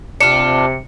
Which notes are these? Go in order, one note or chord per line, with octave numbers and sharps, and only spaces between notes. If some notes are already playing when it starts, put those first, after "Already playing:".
C3 D4 F4 C#7